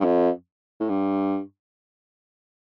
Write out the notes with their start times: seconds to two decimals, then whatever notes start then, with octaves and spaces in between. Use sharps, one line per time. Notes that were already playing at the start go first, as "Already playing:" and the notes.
0.01 G2
0.04 F2
0.80 A2
0.89 G2